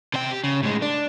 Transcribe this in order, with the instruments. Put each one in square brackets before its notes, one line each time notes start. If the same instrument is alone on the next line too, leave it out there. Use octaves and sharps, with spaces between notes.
[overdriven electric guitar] C3 G5
G4
C#3
A2 G#3
D4